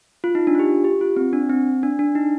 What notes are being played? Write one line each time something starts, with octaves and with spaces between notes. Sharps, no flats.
F4
D#4
D4
F4
G4
G4
F4
C4
D4
C4
D4
D4
D#4